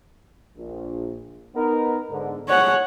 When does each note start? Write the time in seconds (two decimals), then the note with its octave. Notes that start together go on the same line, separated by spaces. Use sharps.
0.56 A#1
1.55 B3 D#4 A#4
2.10 G#2 D3
2.49 G#4 C#5 F#5